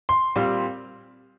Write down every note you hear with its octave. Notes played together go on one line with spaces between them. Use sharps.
C6
A#2 G3 C4